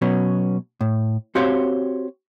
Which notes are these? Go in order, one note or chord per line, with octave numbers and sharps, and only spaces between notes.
B2 F#3 B3 C#4
A2
C4 F#4 G4 C5 C#5 F5